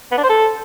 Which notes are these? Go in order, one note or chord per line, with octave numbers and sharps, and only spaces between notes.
B3
D4
C5
A4